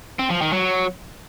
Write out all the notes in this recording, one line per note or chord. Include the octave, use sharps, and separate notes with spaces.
C4
F3
D#3
F#3